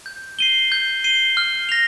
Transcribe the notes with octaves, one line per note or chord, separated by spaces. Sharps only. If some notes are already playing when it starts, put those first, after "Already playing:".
G6
C7 D#7 G7
G6
C7 D#7 G7
F6
A#6 F7